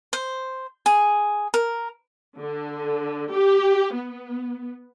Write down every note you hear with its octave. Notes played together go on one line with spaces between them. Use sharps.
C5
G#4
A#4
D3
G4
B3